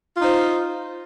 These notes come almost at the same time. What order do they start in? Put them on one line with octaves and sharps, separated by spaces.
F4 D#4 C5